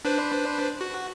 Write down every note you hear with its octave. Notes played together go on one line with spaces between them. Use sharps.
D4 B4 C5
F#4